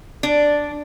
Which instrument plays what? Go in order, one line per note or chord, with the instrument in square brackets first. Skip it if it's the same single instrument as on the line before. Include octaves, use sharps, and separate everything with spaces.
[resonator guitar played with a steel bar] D4